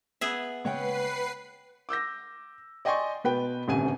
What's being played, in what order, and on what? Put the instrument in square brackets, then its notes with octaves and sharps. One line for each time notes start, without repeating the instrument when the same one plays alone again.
[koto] B3 G#4 E5
[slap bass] C#3 G#3 A#3 [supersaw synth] B4 C7 [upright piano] C#5 F#5 G5
[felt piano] D6 E6 G6 A#6
D5 D#5 G5 G#5 C6 C#6
B2 B4 G5
D#1 A1 D2 C3 G#5 D#7